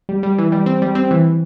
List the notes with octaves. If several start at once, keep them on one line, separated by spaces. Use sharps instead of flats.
G3
G3
E3
G3
C4
G3
C4
E3